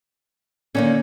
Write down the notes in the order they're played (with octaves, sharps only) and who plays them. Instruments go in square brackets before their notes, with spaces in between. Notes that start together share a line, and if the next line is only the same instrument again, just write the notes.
[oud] D3 D#3 A#3 [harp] C#4